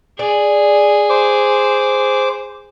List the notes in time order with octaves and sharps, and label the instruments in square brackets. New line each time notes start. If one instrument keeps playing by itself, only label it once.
[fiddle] G#4 [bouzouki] D5
[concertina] C5 D6